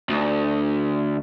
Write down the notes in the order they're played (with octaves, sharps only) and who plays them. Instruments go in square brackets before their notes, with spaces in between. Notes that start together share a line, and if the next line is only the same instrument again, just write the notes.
[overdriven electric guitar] D2